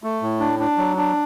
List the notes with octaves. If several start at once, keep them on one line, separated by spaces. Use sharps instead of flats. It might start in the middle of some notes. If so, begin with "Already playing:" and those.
A3
A2
D4
D4
F#3
D4